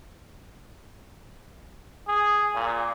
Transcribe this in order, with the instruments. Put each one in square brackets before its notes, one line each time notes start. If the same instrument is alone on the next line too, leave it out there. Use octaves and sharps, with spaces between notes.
[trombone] G#4
A#2